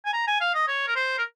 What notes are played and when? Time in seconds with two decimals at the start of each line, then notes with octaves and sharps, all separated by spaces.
0.05 G#5
0.13 A#5
0.27 G#5
0.41 F5
0.55 D#5
0.68 C#5
0.88 A#4
0.96 C5
1.18 A#4